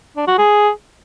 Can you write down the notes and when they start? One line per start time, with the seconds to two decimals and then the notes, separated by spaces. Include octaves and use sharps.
0.17 D4
0.27 F#4
0.38 G#4